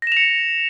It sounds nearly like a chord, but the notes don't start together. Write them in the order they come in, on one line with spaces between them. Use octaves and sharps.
A#6 E7 F7 C#7